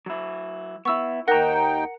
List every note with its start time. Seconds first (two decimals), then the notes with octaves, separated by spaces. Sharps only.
0.06 F#3 E4
0.85 B3 E4 C#6 E6
1.28 D#2 D#4 A#4 F#5 G5 A#5 F#6 A#6